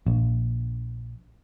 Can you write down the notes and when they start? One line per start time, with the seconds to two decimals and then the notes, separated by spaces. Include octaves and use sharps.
0.07 A#1